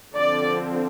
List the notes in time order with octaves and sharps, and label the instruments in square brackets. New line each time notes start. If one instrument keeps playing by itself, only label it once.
[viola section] D3 F3 C4 D5